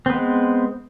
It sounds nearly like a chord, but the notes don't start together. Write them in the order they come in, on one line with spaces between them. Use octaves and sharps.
C4 B3 G#3